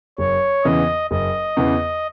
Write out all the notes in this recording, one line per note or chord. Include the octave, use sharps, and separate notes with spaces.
F#1 C#5
E2 C#3 E3 B3 D#5
F#1 D#5
E2 C#3 E3 B3